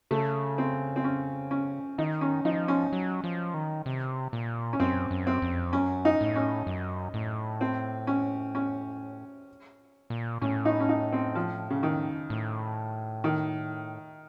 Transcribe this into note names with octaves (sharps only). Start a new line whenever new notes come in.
C#3 A3
C4
C4
C#4
C#4
D#3 D#4
C#4
F3 D#4
C#4
F#3
F3
D#3
C3
A#2
C#4
F#2 C4
F#2
C4
F2
F#2 C#4
D#4
A2
C#4
F#2
A2
C4
C#4
C#4
A#2
A2 C#4
D#4
C#4
D#4
C4
F3
C#3
D#3
A2
D#3